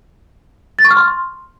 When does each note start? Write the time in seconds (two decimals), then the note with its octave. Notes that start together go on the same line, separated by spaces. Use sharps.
0.79 A6
0.85 C#6
0.91 F6
0.97 C6